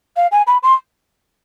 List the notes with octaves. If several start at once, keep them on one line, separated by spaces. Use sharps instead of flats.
F5
G#5
B5
C6